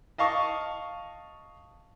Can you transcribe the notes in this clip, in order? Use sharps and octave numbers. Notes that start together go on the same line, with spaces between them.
D#5 F5 A5 C#6 D#6